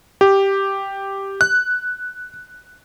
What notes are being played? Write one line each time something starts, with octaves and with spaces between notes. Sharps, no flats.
G4
F#6